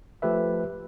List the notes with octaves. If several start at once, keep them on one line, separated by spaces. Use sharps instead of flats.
F3 A3 G4 B4 E5